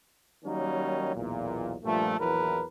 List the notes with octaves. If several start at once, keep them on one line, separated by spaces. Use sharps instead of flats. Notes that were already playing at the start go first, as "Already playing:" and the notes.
D#3 F#3 G3 A#3 C#4 D#4
B1 E2 A#2
G2 A#2 F3 A3
A#1 E2 E3 F#3 A#4 B4